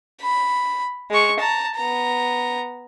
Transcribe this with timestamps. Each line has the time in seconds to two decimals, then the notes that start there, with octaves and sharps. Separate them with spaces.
0.22 B5
1.11 G#3 C#6
1.40 A5 A#5
1.76 B3 A#5